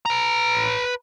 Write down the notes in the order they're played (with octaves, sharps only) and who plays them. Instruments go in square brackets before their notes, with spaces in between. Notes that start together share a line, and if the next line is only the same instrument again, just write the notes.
[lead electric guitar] B4 A#5